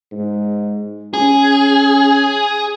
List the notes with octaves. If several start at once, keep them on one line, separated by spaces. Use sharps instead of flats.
G#2
C#4 G#4